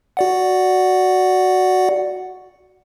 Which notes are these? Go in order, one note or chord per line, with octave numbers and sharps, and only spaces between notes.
F#4 D5 F#5